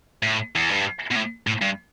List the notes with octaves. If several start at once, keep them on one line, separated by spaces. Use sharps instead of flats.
A2
E2
G2
B2
A2
A2
G2